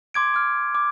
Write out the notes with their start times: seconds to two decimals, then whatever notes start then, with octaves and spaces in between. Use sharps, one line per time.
0.14 C6 D6 G#6 D7
0.34 D6 F6
0.75 D6